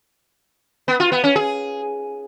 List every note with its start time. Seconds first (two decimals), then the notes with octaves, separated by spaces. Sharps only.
0.88 B3
1.00 F4
1.12 B3
1.24 C#4
1.36 G#4